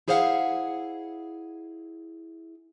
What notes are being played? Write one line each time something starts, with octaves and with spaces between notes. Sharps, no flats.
E4 G#4 C5 D5 F5 F#5